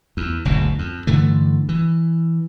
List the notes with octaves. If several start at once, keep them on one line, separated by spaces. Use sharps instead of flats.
E2
F#1 D2 G#2 B2
F2
G2 D3 E3 A3
E3